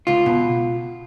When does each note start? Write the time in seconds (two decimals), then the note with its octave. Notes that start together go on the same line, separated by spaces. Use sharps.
0.07 C#2 F4
0.26 B2